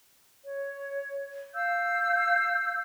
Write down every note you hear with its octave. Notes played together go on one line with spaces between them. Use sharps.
C#5
F5 E6 G6